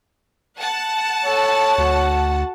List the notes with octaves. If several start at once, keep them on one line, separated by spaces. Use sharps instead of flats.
F#5 A5
A4 C#5
D2 F#4